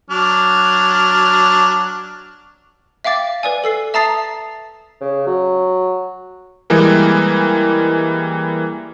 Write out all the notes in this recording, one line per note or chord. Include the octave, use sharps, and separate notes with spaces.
F#3 D4 F6
E5 F5 G5 D6 A6
B4 D5 G#5
A4 E6 C7
E5 A5 A#5 D#6 A6 C7
C#3
F#3
E3 G3 G#3 A#3